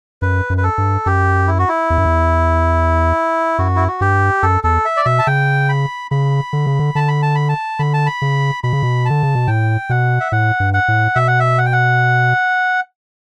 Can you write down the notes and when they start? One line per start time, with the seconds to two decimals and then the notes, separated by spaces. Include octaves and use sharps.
0.22 F#2 B4
0.50 F#2
0.58 B4
0.63 A4
0.78 G2
1.06 F#2 G4
1.47 E4
1.59 F#4
1.69 E4
1.90 E2
1.98 F#2
2.06 E2
3.58 F#2 F#4
3.76 E4
3.88 F#4
4.01 G2 G4
4.43 F#2 A4
4.64 E2 A4
4.85 E5
4.97 D5
5.05 B2 E5
5.19 A5
5.27 C#3 G5
5.69 B5
6.11 C#3 B5
6.53 D3
6.67 C#3
6.79 D3
6.95 D3 A5
7.08 B5
7.22 A5
7.35 B5
7.49 A5
7.79 D3 B5
7.94 A5
8.07 B5
8.22 C#3
8.63 B2 B5
8.73 C#3
8.83 B2
9.06 D3 A5
9.23 C#3
9.35 B2
9.47 A2 G5
9.89 B2 F#5
10.20 E5
10.32 A2 F#5
10.60 G2
10.74 F#5
10.88 A2
11.15 B2 E5
11.28 F#5
11.40 E5
11.58 F#5
11.66 G5
11.73 F#5